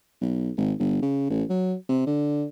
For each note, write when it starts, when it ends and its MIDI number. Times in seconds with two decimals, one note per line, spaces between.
0.21 0.50 35
0.57 0.73 32
0.79 1.00 31
1.02 1.27 49
1.30 1.44 33
1.50 1.75 54
1.89 2.07 48
2.07 2.45 50